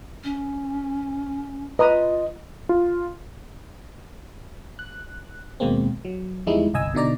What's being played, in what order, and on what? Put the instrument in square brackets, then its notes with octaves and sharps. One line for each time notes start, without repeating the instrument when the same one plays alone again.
[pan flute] C#4
[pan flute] F4 [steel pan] B4 A#5 D#6 [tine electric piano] D#5
[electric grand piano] F4
[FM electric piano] F#6
D#2 B2 G#3 A#3 C4
F#3
E2 F3 G3 G#3 D#4 E4
G1 C2 D#5 G#5 E6
B2 D3 D#4 D5 A#5